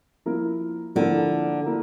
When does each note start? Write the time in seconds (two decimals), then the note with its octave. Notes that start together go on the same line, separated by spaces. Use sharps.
0.26 F3 A#3 E4 A#4
0.95 D3 F3 A#3 E4 A#4
1.66 A#3 E4 A#4